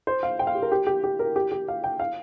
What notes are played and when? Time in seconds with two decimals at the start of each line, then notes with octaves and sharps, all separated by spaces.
0.07 C5
0.23 F5
0.39 G5
0.47 F5
0.55 G4
0.62 A#4
0.72 G4
0.87 G4
1.04 G4
1.19 A#4
1.36 G4
1.51 G4
1.68 F5
1.84 G5
2.00 F5